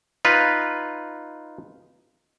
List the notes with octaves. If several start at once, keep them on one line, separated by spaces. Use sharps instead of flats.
D#4 F4 B4